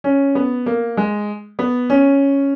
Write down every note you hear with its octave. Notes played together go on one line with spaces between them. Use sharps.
C#4
B3
A#3
G#3
B3
C#4